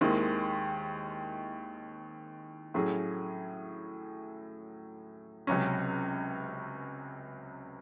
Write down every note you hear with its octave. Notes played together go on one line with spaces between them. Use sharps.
D#2 D#3 G#3 C4 E4
A2 F#3 A3 C#4 G#4
C#2 C3 F#3 C#4